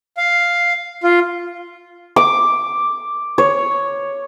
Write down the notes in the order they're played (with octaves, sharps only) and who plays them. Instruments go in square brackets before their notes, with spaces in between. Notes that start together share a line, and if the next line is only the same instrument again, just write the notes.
[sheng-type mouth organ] F5
F4
[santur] D6
C#5